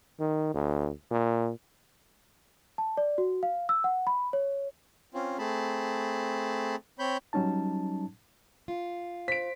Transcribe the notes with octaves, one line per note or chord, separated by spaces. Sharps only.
D#3
D2
A#2
A5
D5
F#4
F5
E6
F#5
B5
C#5
C4 C#4 F4
A3 C4 G#4 A5 B5
C4 C#5 B5 G6
F#3 G3 C#4 D#4 A5
F4
C5 B6 D7